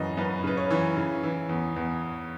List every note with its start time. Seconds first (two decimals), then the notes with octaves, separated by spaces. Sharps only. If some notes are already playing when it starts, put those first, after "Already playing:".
Already playing: F#2 C#3 E3 D#5
0.17 F#2 B4
0.44 C#3 B4
0.57 C#5
0.71 E3
0.97 C#3
1.23 E3
1.49 E2
1.76 E2